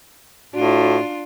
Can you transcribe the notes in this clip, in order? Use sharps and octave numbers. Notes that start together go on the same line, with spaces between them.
A2 D4 F4 F#4